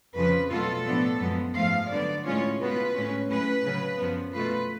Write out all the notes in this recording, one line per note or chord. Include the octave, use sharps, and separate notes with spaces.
F2 C#3 F3 B4
B2 F#3 A3 F4 A4
A2 F3 B3 D4
F#2 F3 G#3 B3
G#2 F3 A3 F5
D3 F#3 B3 D5
A2 G#3 C#4 F4 C#5
B2 G#3 B3 F4 B4
A2 G#3 C#4
A2 F#3 C#4 B4
C#3 F#3 C#4
F#2 F3 B3
B2 A3 F4 B4